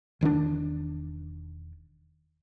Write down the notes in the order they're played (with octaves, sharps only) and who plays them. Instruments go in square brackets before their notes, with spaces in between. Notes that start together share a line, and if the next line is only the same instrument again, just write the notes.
[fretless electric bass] E1 D#3 C#4 D4